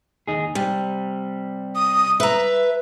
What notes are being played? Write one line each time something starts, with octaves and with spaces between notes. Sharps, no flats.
D#2 D#4 G#4
C3 G3
D#6
B4 E5 A#5